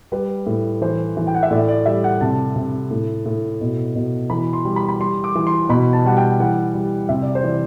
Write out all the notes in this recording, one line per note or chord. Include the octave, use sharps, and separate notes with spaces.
G3 B4
A2
E3 C5
E3
G5
F#5
E5
A2 D5
D5
G3 E5
F#5
C3 A5
C3
A2
A2
B2
B2
E3 B5
C6
G3
B5
B5
G3 C6
D6
E3
C6
B2 B5
A5
G3 F#5
G5
E3 F#5
G3
C3 E5
D5
C5
E3 D5